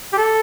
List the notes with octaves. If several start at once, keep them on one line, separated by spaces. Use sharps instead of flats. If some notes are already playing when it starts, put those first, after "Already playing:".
G4
A4